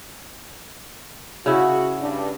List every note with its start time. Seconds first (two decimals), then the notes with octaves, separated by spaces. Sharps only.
1.46 C#3 E4 F#4
2.01 G2 D4